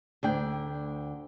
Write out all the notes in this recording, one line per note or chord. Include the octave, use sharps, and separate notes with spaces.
D2 D4 G5